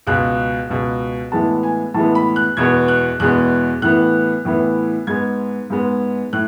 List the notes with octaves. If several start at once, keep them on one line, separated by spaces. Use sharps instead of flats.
C#2 B2 G#3 F#6
C#2 B2 G#3
A2 E3 G#3 B3 A5
G#5
A2 E3 G#3 B3 A5
B5
F#6
E2 B2 G#3 B3 G#6
F#6
E2 B2 G#3 B3 F#6
A2 E3 B3 F#6
A2 E3 B3
G#2 G#3 B3 G#6
G#2 G#3 B3
A2 F#6